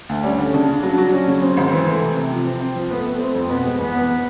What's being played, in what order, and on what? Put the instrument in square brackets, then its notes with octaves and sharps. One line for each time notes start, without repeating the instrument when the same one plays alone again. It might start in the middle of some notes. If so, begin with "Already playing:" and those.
[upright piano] D2
[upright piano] G3 [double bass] C#4
[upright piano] D3
[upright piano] C#3 [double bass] D4
[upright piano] C#3
F#3
F#3
[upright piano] F#3 [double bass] C#4
[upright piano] C#3
[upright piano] C#3 [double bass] C4
[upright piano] G#1
E3
A3
C3
C3
F3
C4
C4
F3
[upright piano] A3 [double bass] B3
[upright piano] A3
[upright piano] A3 [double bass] C4
[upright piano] F2
[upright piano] B2 [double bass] B3
[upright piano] G#3
[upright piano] E2 [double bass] B3
[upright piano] E2